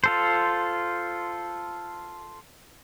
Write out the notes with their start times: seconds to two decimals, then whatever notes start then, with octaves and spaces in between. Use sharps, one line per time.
0.04 F4 A4 C5